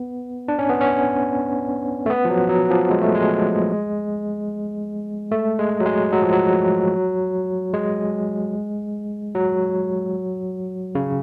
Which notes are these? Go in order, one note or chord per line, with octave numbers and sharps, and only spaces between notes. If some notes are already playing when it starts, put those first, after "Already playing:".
Already playing: B3
D4
C#4
B3
C#4
A3
B3
F3
F#3
F#3
F3
G#3
A3
G#3
A3
G#3
F#3
G#3
F#3
F3
F#3
G#3
F#3
C#3